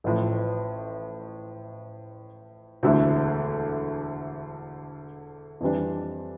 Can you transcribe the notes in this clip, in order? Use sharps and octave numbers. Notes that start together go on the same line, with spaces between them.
A1 A2 F3
E1 D2 D3 A3 E4
F2 E3 G3 D4